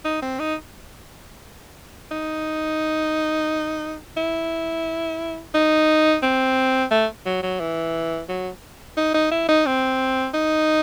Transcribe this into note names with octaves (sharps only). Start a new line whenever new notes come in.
D#4
C4
D#4
D#4
E4
D#4
C4
A3
F#3
F#3
E3
F#3
D#4
D#4
E4
D#4
C4
D#4